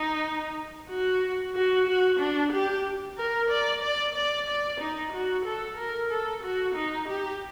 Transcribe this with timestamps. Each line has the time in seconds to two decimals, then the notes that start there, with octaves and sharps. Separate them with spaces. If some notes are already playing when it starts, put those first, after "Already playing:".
Already playing: D#4
0.90 F#4
1.55 F#4
1.87 F#4
2.20 D4
2.52 G4
3.18 A#4
3.50 D5
3.83 D5
4.15 D5
4.48 D5
4.81 D#4
5.13 F#4
5.45 A4
5.77 A#4
6.10 A4
6.43 F#4
6.75 D#4
7.08 G4